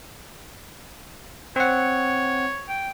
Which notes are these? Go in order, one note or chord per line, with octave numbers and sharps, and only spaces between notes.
C4 C#5 F#5
G5